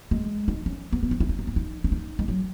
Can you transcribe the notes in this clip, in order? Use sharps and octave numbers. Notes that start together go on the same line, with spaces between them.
G#3
D#4
C#4
B3
B3
D#4
E4
D#4
C#4
B3
D#4
C#4
D#4
G#3
F#3